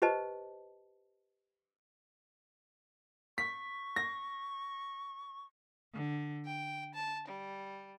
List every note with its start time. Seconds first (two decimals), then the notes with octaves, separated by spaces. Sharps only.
0.02 G4 B4 C5 D#5 A5
3.38 C#6 B6
3.96 A#6
5.93 D3
6.44 G5
6.93 A5
7.27 G3